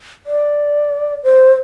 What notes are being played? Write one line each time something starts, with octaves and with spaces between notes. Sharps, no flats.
D5
C5